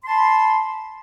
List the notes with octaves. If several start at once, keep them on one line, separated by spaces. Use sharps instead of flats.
A5 B5 C6